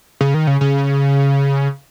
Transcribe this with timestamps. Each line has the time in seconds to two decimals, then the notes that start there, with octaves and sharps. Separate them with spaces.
0.21 C#3
0.34 D#3
0.47 C#3
0.61 C#3